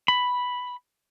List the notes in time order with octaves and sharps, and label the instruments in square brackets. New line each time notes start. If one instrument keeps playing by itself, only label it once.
[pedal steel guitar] B5